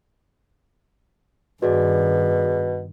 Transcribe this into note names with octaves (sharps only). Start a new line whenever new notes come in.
G2 B2 D#3 F#4 G#4 D5